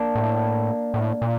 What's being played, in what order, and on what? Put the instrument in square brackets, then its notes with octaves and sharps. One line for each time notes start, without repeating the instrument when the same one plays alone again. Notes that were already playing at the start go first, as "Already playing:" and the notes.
Already playing: [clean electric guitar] A#3 D4
[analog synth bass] A2
A2
A#2